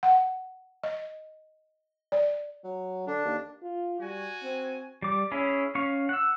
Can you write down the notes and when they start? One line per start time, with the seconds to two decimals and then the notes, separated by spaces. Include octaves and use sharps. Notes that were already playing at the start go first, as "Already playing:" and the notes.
0.03 F#5
0.83 D#5
2.12 D5
2.64 F#3
3.07 D3 D4
3.25 D#2
3.62 F4
4.00 G3 F#4 G#5
4.43 C4
5.02 G3 D6
5.31 C#4 E4 G#4
5.75 C#4 F5 C#6
6.09 F#5 E6